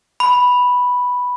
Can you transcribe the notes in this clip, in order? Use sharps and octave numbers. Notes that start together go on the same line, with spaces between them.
B5